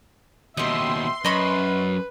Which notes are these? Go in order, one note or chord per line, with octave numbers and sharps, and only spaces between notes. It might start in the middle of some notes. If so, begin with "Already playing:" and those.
D#2 B2 G4 D#5 E5 C6
F#2 B4 D#5 B5 C#6